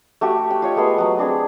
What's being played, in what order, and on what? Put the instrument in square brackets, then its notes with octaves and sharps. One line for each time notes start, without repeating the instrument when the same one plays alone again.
[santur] A3 F#4 G4
G5
F4 C#5 D#5
G#3 A3 B3 C6
F#3 B3
C4 D4 G#4